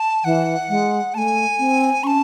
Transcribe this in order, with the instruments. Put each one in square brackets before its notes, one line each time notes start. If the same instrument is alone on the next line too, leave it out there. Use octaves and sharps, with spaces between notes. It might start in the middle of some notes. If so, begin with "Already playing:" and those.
Already playing: [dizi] A5
[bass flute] E3 [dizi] F#5
[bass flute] G#3
[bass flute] A3 [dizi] G#5 A5
[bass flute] C4
[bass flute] C#4 [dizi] C#6
[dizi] A5